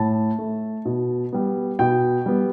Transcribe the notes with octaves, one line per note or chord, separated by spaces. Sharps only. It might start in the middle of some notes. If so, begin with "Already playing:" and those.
Already playing: A2 A5
A3
B2
G3 B3
B2 G5
G3 B3